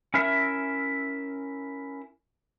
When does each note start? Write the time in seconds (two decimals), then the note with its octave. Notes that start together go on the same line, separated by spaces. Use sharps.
0.14 C#4 E4 A#4 E5